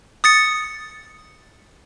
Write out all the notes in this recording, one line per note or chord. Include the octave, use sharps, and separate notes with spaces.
D#6 A6 C#7